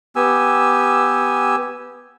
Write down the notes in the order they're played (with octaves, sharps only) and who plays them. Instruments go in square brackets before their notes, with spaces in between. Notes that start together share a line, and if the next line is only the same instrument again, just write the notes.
[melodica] B3 G4 G#5 E6